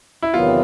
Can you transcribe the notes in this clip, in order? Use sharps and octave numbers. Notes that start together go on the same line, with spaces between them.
E4
E2 C3 D#3 F#3 B3 F4